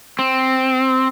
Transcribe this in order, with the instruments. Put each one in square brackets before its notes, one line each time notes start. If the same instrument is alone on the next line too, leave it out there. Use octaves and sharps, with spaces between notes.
[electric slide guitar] C4